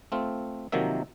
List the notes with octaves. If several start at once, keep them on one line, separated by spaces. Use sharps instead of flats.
A3 C4 F4
C3 D#3 F3 F#3 A#3 E5